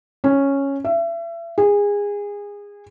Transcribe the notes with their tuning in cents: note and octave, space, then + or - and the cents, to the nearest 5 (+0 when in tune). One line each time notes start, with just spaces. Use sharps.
C#4 -5
E5 +35
G#4 -25